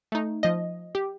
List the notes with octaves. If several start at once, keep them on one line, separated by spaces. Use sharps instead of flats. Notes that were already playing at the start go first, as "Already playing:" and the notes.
A3 D#4
F3 D#5
G4